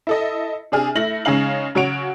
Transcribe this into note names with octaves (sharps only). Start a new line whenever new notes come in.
E4 A4 D#5
C3 D4 G#4 F6
A3 E4 A#6 F#7
C#3 G#3 C#4 D#4 F5 F#7
C#3 F#3 C#5 F#5 D7 F7